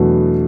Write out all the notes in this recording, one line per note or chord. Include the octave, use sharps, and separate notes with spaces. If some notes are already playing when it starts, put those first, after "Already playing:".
Already playing: E2 B2 F#3 A3 D4